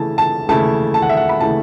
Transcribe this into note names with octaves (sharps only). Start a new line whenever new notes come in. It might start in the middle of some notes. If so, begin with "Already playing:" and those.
Already playing: C#3 E3 A3 E4 A5
A5
C#3 E3 A3 E4 A5
A5
F#5
E5
F#5
B5
C#3 E3 A3 E4 A5